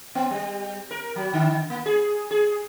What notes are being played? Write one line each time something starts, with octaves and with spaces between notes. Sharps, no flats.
B3
G3
A#4
F#3
D3
A#3
G#4
G#4